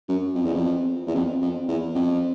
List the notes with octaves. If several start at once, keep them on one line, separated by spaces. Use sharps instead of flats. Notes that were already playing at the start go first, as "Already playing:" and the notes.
F#2
F2
E2
F2
E2
F2
F2
E2
F2